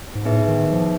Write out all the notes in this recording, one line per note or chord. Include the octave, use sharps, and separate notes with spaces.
G#2
A2 B3 D#4 G#4 B4 E5
D#3
F3